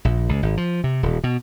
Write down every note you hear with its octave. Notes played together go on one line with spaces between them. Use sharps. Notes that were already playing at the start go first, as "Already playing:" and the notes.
A#1
C#2
G#1
F3
C3
D#1
B2